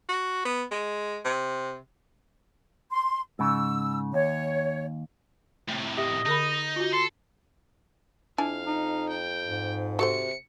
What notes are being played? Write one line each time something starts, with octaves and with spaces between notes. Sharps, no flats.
F#4
B3
G#3
C3
C6
G#2 C#3 E6
D#2 C#5
A2 C3
G4 D#5 E5
D3 D#4 A#4 B5
F4 F#4
A4 C6
F2 D4 E4 F5 G#5
D#4
G5
G#2
C3 F#4 A4 C5 C#7